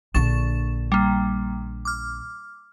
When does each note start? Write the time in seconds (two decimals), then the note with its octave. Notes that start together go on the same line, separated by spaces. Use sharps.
0.14 A#1 D3 C#6 A6 E7
0.92 G3 A#3
1.85 D6 F6